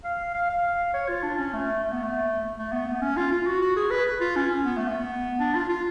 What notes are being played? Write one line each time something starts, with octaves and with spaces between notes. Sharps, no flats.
F5
F5
F5
C#5
F4
D4
C#4
A3
A3
B3
A3
A3
B3
A3
B3
C#4
F4
F4
F#4
F#4
G#4
B4
F4
C#4
B3
A3
B3
D4
F4
F4